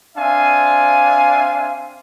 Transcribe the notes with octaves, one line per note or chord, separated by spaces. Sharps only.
C4 D4 E5 F5 G#5